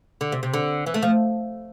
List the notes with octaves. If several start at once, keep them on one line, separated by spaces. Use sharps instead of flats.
D3
C3
C3
D3
E3
A3
F3